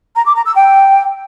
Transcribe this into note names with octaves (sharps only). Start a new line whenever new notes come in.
A#5
D6
A#5
E6
G5